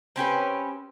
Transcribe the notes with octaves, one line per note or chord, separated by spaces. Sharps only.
C4 C#4 G4 B4